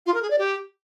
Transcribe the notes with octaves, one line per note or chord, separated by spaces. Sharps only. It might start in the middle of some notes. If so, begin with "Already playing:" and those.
F4
A#4
G#4
D5
G4